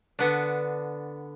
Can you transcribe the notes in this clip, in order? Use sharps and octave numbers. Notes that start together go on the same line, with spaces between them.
D3 B3 D4